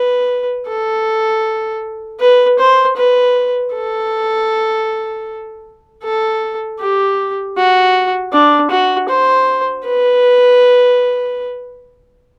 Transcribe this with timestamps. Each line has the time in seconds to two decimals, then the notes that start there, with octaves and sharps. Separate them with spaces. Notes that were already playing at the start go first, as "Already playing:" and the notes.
Already playing: B4
0.67 A4
2.20 B4
2.59 C5
2.97 B4
3.74 A4
6.03 A4
6.80 G4
7.56 F#4
8.32 D4
8.70 F#4
9.09 C5
9.85 B4